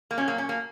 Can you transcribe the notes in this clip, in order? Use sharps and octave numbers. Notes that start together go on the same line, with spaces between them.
A#3
A#2 F#3 C#4
A#3
C#4
A#3